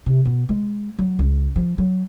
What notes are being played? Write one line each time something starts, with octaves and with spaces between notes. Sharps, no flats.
C3
B2
G#3
F#3
C#2
F3
F#3